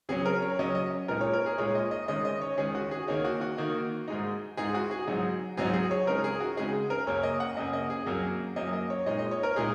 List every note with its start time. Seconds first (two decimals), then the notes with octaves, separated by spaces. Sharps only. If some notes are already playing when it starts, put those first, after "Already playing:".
0.09 C#3 F#3 C#4 G#4
0.25 A#4
0.42 C#5
0.59 C#3 F#3 C#4 D#5
0.75 D#5
1.08 A#2 G#3 D#4 A#4
1.21 C#5
1.33 A#4
1.46 G#4
1.58 A#2 G#3 D#4 C#5
1.75 D#5
1.91 D#5
2.08 D#3 G#3 C#4 D#5
2.25 D#5
2.41 C#5
2.58 D#3 G#3 C#4 G#4
2.75 F#4
2.91 G#4
3.08 D#3 A#3 D#4 C#5
3.25 F#4
3.41 F#4
3.58 D#3 A#3 D#4
4.08 G#2 G#3 D#4
4.57 G#2 G#3 D#4 G#4
4.74 F#4
4.91 G#4
5.07 G#2 F#3 D#4
5.57 G#2 F#3 D#4 G#4
5.73 G#4
5.91 C#5
6.07 C#3 G#3 D#4 A#4
6.24 G#4
6.40 F#4
6.57 C#3 G#3 D#4 G#4
6.90 A#4
7.07 F#2 C#3 A#3 C#5
7.23 D#5
7.40 F#5
7.57 F#2 C#3 A#3 D#5
7.73 D#5
7.90 G#4
8.06 F#2 F#3 A#3
8.56 F#2 F#3 A#3 D#5
8.73 D#5
8.90 C#5
9.06 A#2 G#3 D#4 D#5
9.19 D#5
9.31 C#5
9.43 A#4
9.56 A#2 G#3 D#4 G#4